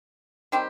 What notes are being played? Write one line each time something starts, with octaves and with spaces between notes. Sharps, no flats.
D#3 G3 C4 G4